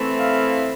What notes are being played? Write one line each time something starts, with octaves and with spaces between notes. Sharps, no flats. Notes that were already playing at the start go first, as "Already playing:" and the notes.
Already playing: E3 A3 C4 E4
F5